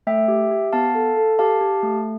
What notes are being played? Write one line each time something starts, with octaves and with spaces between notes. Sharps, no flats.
A3 E5 G5
G4
G4
B3 F5 A5
A4
A4
G4 F5 A5
G4
A3